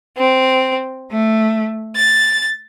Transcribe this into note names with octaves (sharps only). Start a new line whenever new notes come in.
C4
A3
A6